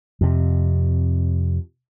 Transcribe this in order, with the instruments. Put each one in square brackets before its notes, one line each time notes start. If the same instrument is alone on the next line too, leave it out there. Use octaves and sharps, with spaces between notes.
[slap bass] F2 C3